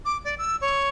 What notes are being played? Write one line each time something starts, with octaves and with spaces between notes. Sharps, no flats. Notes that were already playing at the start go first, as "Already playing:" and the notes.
D6
D5
E6
C#5